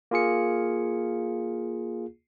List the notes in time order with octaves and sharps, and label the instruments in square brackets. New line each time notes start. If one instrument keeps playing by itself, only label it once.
[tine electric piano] A#3 F4 G#4 C#7